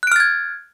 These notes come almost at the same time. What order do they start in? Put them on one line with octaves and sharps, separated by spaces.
F#6 D7 F6 A6 G#6